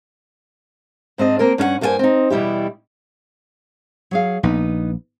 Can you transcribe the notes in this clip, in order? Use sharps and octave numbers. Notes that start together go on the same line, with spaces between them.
G#2 C4 D4 D#5
A#3 C4 A#4
G2 C#4 A4 F#5
G2 A#3 F4 F#4 C5 G#5
C4 D#4
E2 B2 G3 E4 G4
F#3 G#4 F5
A#1 B3 D#4 B4